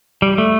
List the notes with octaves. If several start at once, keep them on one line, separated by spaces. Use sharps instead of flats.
G3
A3